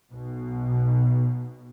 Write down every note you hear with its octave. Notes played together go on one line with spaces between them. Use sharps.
B1 B2